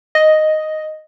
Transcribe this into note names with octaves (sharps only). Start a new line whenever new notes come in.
D#5